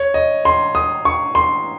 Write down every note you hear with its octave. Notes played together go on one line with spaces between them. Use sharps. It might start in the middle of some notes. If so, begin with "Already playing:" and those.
Already playing: C#5
D#5
C6
D#6
C#6
C6